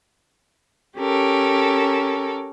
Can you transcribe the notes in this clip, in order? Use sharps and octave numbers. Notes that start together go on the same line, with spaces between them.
C#4 G4 A4 A#4